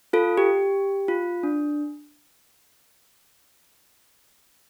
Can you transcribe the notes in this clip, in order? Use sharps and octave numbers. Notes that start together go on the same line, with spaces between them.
F4 A4
G4
F4
D4